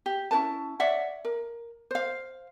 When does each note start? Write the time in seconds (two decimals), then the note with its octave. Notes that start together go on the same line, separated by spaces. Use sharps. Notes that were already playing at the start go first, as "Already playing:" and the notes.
0.06 G4
0.31 C#4 E4 B4 A5
0.80 C#5 D5 E5 F#5
1.25 A#4
1.91 C5 F5